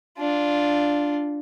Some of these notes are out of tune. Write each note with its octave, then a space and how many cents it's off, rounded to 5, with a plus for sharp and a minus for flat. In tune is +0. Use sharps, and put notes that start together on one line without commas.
D4 +0 F4 +0